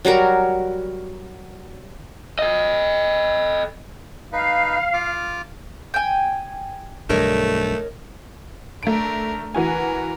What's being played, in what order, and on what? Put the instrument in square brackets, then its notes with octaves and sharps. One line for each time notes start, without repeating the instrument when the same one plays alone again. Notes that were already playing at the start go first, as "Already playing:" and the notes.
[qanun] F#3 G3 F#4 A#4
[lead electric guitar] A4 D#5
[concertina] D#4 B4 [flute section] F5
[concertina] F4 D6 F6
[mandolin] G5 G#5
[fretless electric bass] B1 G2 D3 [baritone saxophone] A3 [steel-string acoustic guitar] A#4 C#5 D#5
[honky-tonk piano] A3 D7 [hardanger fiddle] D4 A#4
[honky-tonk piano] E3 F#4 G#5 [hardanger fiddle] A#4 B4